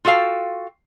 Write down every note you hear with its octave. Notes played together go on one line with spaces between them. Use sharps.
F4 F#4 A4 F5 G5